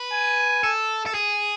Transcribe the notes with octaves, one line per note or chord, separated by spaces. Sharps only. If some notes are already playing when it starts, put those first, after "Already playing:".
Already playing: B4
G#5
A4
A4
G#4